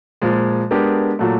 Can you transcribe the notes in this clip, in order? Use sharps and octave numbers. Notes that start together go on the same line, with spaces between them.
A#2 F3 G#3
G#3 B3 D4 G4 A#4
A#2 F#3 A3